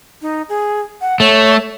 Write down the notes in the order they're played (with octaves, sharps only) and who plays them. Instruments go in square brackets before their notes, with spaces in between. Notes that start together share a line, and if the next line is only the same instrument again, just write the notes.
[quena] D#4
G#4
F#5
[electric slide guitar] A3 [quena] C#5